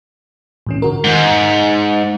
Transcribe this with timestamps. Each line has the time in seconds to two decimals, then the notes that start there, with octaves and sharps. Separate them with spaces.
0.67 A2 E3 C#4
0.82 D3 F#4 A#4
1.04 G#2 D#3 G#3
1.32 C#7